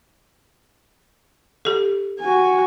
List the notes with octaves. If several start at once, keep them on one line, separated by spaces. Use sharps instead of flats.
G4 A4
F#4 G#5